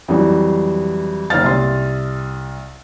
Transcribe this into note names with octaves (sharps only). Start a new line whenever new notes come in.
F2 E3 F#3 G3
F#1 D#4 C5 F5 F6 A6
C2 C6